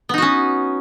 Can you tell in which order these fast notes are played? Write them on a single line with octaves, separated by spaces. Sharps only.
B3 D#4 F#4 C#4